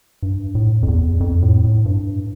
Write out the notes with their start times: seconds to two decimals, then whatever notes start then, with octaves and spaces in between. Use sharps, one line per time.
0.23 G2
0.55 A2
0.83 F2
0.88 E2
1.20 F2
1.42 A2
1.64 A2
1.85 G2